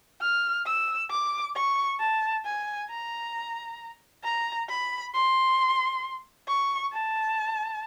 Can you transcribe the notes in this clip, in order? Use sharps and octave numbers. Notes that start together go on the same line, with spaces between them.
F6
E6
D6
C#6
A5
G#5
A#5
A#5
B5
C6
C#6
A5